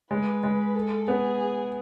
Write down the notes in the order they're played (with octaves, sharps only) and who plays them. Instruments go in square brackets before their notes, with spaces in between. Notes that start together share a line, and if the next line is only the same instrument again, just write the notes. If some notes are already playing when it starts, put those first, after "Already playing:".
[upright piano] G#3 [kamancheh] B4
[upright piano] G#3
[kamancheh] A4
[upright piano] B3 [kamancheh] G#4